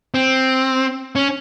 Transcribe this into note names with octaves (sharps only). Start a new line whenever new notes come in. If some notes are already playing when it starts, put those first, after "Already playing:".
C4
C#4